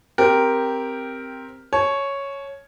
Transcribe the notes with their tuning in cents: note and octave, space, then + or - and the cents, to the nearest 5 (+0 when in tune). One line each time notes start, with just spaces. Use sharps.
C4 +5 G4 +0 A#4 +0
C#5 +0 A5 -40